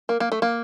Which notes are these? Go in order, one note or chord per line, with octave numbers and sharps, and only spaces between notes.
A#3
A#3
A3
A#3